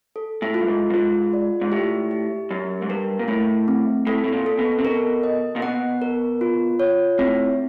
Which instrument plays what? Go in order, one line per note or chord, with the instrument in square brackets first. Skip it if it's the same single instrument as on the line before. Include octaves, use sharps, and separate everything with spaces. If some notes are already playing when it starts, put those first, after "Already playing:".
[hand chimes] A4
[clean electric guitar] A2
[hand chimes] F4
[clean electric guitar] G2
G#2
G2
[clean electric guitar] G#2 [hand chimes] F4
[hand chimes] D5
[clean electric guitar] G#2
[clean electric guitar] A2 [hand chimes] G4
[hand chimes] G4
[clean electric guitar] F#2 [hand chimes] G4
[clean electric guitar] G#2
[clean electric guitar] G2 [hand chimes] A#4
[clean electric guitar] A#2
[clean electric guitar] A2 [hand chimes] A3
[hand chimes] C4
[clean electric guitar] A2 [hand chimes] A4
[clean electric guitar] A2
A#2
[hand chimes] A4
[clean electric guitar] B2
C3
[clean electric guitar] B2 [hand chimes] A#4
[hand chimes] D#5
[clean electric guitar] A#2
[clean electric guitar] B2 [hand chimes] F#5
[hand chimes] A#4
F4
C#5
[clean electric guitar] A2 [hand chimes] C4